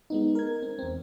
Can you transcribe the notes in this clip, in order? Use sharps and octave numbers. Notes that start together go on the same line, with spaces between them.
G#3 B3 D#4
A#4 G#6
C4
E2 C4